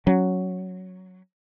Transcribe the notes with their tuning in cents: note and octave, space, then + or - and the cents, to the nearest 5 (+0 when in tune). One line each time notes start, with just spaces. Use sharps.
F#3 +0 C#4 +0